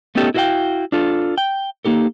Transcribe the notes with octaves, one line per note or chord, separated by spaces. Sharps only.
A3 B3 C#4 D#4 G4 A4
E4 F#4 A4 E5 F5 G5
D4 F4 A4
G5
A#3 D#4 G4 A4